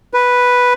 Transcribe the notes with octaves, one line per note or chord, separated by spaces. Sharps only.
B4